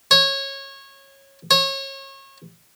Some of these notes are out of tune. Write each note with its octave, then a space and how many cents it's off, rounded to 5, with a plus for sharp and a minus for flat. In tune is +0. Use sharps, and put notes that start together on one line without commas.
C#5 -20
C#5 -30